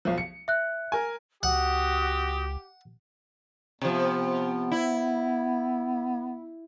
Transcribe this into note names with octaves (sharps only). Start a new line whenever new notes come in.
B1 F3
C#7
E5 F#6
A#4 G#5
C#2 F#4 G4 F#5 D#6
C3 F3 B3
E4